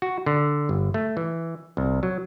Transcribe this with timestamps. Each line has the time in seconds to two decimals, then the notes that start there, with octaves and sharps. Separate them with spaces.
0.02 F#4
0.26 D3
0.69 G1
0.94 A3
1.17 E3
1.77 C2
2.03 F#3